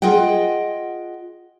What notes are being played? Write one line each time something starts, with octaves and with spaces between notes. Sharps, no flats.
F4 G#4 D#5 F#5 G5